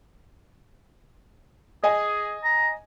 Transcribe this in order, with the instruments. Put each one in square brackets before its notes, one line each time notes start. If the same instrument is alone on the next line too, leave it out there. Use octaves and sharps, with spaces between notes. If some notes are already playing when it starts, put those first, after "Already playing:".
[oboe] G#4 [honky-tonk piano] D#5 G#5
[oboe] A#5